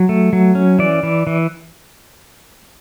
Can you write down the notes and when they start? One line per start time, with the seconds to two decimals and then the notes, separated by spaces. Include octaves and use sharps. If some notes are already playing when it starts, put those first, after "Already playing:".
Already playing: F#3
0.09 A3
0.33 F#3
0.55 C#4
0.79 E3 D5
1.03 E3
1.27 E3